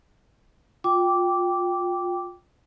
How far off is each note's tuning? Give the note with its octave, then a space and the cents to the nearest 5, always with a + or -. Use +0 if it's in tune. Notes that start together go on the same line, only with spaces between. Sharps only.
F4 +25 G5 +0 D6 -10